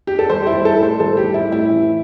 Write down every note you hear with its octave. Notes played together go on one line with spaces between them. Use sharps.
G4
A4
G3 C5
G4
E4
G3
A4
A2
C5
G3 A4
G4
G3
E4
A2
E4
E3